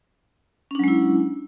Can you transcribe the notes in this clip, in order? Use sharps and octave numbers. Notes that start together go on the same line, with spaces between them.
F#3 G#3 C#4 D4 E4